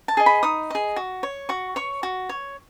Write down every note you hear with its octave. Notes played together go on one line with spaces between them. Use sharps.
A5
G#4 D#5
B5
D#4 D#6
G#4 D#5
F#4
C#5
F#4 C#6
C#5 C#6
F#4
C#5